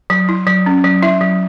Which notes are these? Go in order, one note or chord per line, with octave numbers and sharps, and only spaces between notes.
F#3
E4
F#3
C#4
F#3
E4 E5
F#3